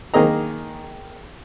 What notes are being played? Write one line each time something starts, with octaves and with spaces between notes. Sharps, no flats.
D#3 A#3 G#4 D#5 A#5